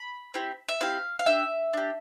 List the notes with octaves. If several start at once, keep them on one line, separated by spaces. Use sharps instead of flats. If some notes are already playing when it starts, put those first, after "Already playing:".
Already playing: B5
C4 E4 G4
E5
C4 E4 G4 F5
F5
D4 G4 E5
D4 G4